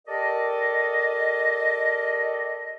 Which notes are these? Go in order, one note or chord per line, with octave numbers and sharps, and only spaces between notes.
G4 A4 A#4 D5 D#5